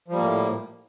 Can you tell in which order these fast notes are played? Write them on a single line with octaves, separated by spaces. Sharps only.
F3 G3 A#3 A2